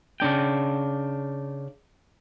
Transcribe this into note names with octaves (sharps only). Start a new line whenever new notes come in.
C#3 D4 G5